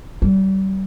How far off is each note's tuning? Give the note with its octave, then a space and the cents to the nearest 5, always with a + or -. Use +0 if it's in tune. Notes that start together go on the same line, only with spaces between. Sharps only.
G3 -35